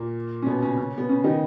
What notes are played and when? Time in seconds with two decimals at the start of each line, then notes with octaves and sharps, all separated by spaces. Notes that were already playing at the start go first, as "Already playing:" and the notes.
Already playing: A#2 A#3
0.42 C#4
0.46 B2 B3
0.62 C#3 C#4
0.77 C#3 C#4
0.98 B3
1.09 C#3 C#4
1.24 D#3 D#4